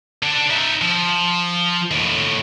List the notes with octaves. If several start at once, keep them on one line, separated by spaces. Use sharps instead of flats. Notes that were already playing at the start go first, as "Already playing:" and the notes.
D4 A4
D#4 E5
F3
D#2 A2